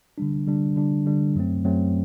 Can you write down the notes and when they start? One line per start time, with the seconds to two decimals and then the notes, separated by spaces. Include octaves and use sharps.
0.18 D3 G3 D4
0.47 D3 G3 D4
0.76 D3 G3 D4
1.06 D3 G3 D4
1.35 F#2 F#3 A3 C4
1.65 F#2 F#3 A3 C4